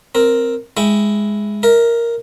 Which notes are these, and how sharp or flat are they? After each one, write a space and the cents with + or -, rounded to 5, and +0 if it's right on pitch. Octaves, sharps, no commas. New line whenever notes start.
C4 +0 A#4 +0
G#3 +0 E4 +0 G5 +0
A#4 +0 E5 -40